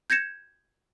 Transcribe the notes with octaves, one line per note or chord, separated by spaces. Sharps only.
G6 G#6 A#6 C#7 E7